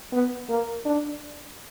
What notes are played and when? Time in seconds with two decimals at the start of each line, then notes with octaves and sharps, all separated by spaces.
0.12 B3
0.49 A#3
0.86 D4